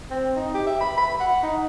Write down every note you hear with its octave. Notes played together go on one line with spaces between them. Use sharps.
C4
D#4
G4
E5
B5
B5
F#5
D#4